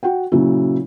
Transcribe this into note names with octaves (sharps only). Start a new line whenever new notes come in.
F#4 F#5 G5
A#2 C#3 F#3 E4